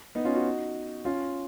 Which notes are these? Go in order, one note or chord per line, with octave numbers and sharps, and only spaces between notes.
B3 D#4
C#4 F4
D#4 F#4
C#4 F4